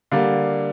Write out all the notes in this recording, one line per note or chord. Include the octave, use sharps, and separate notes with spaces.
D3 G3 A#3 D5 F5